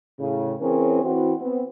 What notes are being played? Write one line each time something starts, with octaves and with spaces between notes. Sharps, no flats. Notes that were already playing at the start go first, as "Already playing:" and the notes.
A2 C#3
E3 C4 C#4 G#4 A#4 C#5
E3 C4 E4 F#4
B3 C4